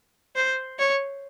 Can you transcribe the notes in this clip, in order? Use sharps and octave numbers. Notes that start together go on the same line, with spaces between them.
C5
C#5